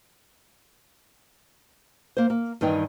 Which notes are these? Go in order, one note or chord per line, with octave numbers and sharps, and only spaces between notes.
A#3 C5
A#3
G2 D#3 E3 D#4 G5